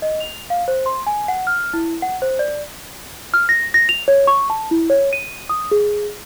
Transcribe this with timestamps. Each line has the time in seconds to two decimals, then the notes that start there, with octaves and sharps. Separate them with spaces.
0.02 D#5
0.20 F7
0.50 F5
0.68 C5
0.86 C6
1.07 G#5
1.28 F#5
1.47 F6
1.74 E4
2.02 F#5
2.22 C5
2.39 D5
3.34 F6
3.49 A#6
3.74 A#6
3.89 F7
4.08 C#5
4.27 C#6
4.50 A5
4.71 E4
4.90 C#5
5.13 D#7
5.49 D#6
5.71 G#4